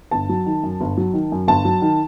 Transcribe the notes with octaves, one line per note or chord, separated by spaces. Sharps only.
G1 A5
F#3
D#3
F#2
G1
F#3
D#3
F#2
G1 A5
F#3
D#3